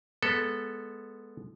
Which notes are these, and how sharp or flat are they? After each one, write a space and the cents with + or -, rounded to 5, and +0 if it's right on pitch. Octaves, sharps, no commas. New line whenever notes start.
G#3 +0 B3 -10 A4 +0